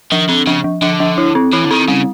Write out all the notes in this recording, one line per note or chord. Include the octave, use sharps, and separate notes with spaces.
D#3 F3
D3 C4
C#3 F3
F3
D3 F3
F3
E4
C4
E3 E4
D3
D#3 C4
C#3 G3